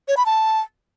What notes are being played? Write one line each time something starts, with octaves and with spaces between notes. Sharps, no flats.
C#5
B5
A5